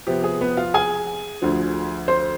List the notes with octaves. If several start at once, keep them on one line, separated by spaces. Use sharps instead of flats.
C3 F3 B3 G4
G#4
B3 B4
F4 F5
G#4 G#5
D2 D3 F3
C5 C6